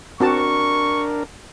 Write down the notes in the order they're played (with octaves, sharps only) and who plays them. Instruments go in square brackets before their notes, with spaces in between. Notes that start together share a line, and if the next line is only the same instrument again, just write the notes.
[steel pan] C4 F#4 A5 [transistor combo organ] D4 A#4 [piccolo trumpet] C#6